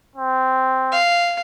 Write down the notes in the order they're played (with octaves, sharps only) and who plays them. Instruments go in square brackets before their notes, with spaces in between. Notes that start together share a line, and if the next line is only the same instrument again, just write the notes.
[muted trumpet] C4
[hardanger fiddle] F5